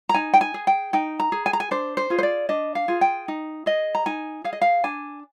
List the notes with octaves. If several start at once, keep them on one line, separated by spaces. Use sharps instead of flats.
A#5
D#4 G#5
G5
G#5
G#4
G5
D#4 G5
A#5
G#4
G#5
A#5
G#5
D4 C5
C5
F4 G#4
C5
D5
D4 D#5
F5
F4 G#4
G5
D#4
G#4 D#5
A#5
D#4 G#5
G#4 F5
D#5
F5
D4 G#5